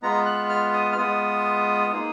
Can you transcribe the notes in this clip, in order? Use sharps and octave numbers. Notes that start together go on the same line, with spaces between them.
G#3 B3 F4 A#5
F#6
F6
D#6
F6
G#3 B3 F4 D#6
A#3 D#4 G#4